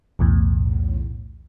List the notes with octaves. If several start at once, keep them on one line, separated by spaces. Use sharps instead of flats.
B1 E2 A2